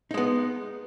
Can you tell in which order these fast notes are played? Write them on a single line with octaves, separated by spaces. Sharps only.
D#4 G#3 B3